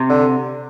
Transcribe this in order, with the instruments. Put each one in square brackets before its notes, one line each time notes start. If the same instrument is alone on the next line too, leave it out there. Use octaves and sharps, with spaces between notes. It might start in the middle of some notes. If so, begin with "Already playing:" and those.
Already playing: [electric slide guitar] C3
[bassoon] D3